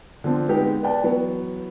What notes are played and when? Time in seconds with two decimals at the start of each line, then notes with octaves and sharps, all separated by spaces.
0.24 D3 F3 C4
0.48 G#3 B3 D#4 G4 G#4
0.83 B4 D5 G5 A5
1.03 E3 F#3 B3